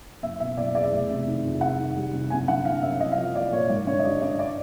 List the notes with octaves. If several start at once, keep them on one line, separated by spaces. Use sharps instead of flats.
F#1 E5
B2 E5
F#1 D5
E2 D5
E5
F1
C3
D#3
F2
C2 F#5
D#3
G3
C3
F#1 G#5
D3 F#5
F#1 F5
F#2 E5
C2 D#5
F5
F3
A#3 D5
A#2 C#5
G#1 D5
D3 C#5
D#5
G3 D5
G2 D5
D5